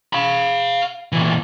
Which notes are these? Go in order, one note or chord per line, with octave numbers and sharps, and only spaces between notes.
F5 B5
A#2 E3